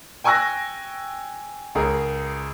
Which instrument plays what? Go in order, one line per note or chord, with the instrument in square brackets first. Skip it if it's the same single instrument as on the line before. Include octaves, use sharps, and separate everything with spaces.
[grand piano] G5 G#5 C#6 E6 F#6 A#6
C#2 G#4 A#4